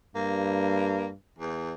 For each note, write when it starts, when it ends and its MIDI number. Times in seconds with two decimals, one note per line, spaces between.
0.16 1.15 43
0.16 1.07 58
1.39 1.73 40